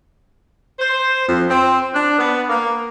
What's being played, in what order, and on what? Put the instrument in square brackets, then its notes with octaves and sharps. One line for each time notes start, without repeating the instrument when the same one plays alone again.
[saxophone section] C5
F2
C4
D4
B3
A#3